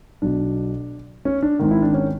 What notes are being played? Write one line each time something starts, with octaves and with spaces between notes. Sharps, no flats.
B1 B2 D4
C#4
D4
G#1 G#2 D#3
E4
D4
C#4